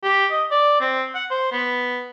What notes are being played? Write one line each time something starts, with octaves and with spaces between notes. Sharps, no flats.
G4
D#5
D5
C4
F#5
C5
B3